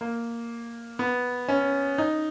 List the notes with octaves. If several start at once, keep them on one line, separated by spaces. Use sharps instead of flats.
A#3
B3
C#4
D#4